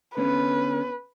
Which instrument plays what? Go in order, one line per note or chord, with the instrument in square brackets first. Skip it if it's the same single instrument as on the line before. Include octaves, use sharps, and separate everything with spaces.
[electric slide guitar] D3 B3 C#4 [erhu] B4